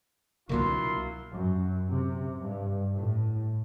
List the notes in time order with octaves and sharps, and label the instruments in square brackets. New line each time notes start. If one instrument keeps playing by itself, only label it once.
[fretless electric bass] C2 B2 D3 [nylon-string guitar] F#3 A#3 [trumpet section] E4 F4 C6
[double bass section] F#2
C3
G2
A2